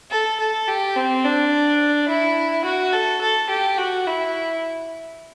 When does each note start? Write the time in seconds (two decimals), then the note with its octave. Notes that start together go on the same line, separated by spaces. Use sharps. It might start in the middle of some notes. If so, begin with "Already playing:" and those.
0.11 A4
0.40 A4
0.68 G4
0.96 C4
1.24 D4
2.09 E4
2.65 F#4
2.93 A4
3.21 A4
3.50 G4
3.78 F#4
4.07 E4